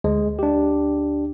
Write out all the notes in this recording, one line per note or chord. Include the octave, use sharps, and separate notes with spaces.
D2 G#3
D4 G4